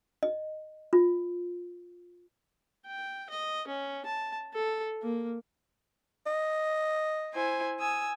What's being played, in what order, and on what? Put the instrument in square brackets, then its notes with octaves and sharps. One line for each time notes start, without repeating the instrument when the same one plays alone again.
[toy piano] D#5
F4
[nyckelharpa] G5
D#5
C#4
A5
A4
A#3
[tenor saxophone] D#5
[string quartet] E4 C5 G#5
G#5 D#6 E6